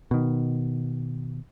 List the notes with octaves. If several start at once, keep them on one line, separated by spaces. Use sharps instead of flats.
B2 D#3